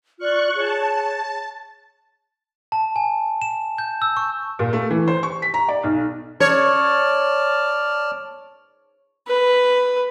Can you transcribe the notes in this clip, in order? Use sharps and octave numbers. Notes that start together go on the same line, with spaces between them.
F4 D5 C#6 F6 F#6
G#4 C#5 A5
A5
G#5
E7
G6
E6
C#6
A#2
A3
E3
C5
C#6
B6
A#5
D5
B1
C#5 D5 A5 F6
B4